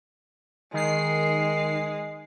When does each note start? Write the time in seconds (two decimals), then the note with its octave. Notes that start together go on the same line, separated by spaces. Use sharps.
0.74 D#3 G#3 C7